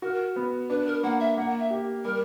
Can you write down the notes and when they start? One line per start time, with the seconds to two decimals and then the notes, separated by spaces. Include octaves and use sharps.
0.02 F#4 A#4
0.36 B3
0.70 D4 B4
0.87 A#4
1.03 A#3 F#5
1.20 E5
1.37 A#3 F#5
1.59 E5
1.71 G4
2.04 G3 A#4